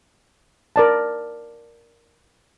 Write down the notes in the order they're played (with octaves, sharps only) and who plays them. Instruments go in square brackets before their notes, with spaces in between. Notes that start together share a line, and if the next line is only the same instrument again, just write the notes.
[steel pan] A#4 D5 A5